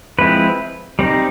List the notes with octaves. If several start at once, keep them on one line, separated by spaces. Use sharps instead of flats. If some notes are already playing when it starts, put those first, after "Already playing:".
F3 G#3 C4 E4 B4
G3 C4 D#4